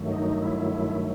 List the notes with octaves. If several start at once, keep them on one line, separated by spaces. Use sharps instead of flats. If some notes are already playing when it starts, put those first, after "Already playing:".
Already playing: G2 D#3 F#3 A3
D#4
E4